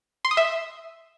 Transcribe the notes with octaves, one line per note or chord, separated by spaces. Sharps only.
C6
D#6
E5